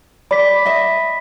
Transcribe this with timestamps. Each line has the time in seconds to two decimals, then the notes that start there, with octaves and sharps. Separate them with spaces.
0.31 D5 B5 B6
0.65 D#5 E5